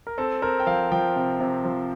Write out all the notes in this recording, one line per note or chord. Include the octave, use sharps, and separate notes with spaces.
A#4
C4 A4
C4 A#4
G5
F3 F5
F3 G5
C3
C3
F3